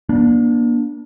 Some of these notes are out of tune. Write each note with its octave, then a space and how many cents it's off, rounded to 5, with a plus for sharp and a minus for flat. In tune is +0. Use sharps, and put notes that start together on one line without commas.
A#3 +35 D4 +0